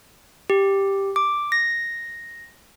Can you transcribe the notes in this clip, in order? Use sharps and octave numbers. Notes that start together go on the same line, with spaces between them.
G4
D6
A#6